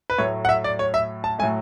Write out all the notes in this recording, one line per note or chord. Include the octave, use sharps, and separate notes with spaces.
B4
A2 F#3 A3 C#5
F#5
E5
D5
C#5
E5
A5
A2 F#3 A3 G#5